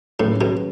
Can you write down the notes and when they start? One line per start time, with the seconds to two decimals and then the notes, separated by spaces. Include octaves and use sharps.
0.19 A2 D#3 F#3 C#4 G#4 B4
0.41 B2